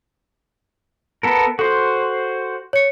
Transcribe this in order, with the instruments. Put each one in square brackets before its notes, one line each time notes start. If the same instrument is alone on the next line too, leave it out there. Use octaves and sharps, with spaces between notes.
[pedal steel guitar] B3 A4 A#4
[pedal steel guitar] F#4 C5 [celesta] A4
[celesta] C#5 C#7